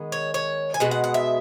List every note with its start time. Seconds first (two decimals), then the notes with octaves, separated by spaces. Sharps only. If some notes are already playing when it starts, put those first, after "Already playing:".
Already playing: D#3 G#3 B3
0.12 C#5
0.34 C#5
0.74 G#5
0.80 B2 G#3 F#5
0.91 F#5
1.04 F#5
1.14 E5